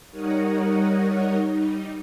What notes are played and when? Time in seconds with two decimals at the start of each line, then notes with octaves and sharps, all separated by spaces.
0.11 G3 D#4 A#4 C#5 D#5 F#5
1.48 G3 D#4